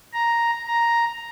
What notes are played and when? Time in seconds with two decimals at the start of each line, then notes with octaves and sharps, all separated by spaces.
0.13 A#5
0.67 A#5